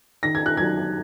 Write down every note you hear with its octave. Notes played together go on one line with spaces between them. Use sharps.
D#3 A#6
G#6
F#6
F#3 G#6